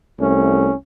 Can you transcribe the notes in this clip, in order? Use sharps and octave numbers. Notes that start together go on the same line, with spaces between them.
C2 A3 C#4